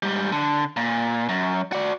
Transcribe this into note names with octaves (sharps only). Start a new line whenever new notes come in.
G#2 G3
D3
A#2
F#2
F#4 D5